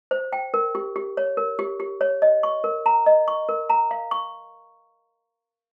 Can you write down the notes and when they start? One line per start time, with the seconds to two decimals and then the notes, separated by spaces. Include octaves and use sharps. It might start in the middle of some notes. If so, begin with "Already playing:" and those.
0.11 C5
0.33 G5
0.54 A#4
0.75 G4
0.96 G4
1.17 C#5
1.37 A#4
1.59 G4
1.80 G4
2.01 C#5
2.22 D#5
2.43 C#6
2.64 A#4
2.86 A#5
3.06 D#5
3.28 C#6
3.49 A#4
3.70 A#5
3.91 F5
4.11 C#6